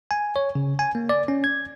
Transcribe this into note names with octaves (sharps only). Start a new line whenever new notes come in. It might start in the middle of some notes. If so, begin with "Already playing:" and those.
G#5
C#5
C#3
G#5
A#3
D5
C#4
G#6